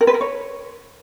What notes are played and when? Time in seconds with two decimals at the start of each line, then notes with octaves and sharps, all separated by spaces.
0.01 A#4
0.07 B4
0.14 A#4
0.21 C#5